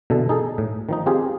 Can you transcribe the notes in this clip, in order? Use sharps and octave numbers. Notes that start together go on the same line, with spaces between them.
B2 D3 E3 A4
D#4 G#4 A4
A2
D#3 F3 D#4
C4 F4 G4 G#4 C5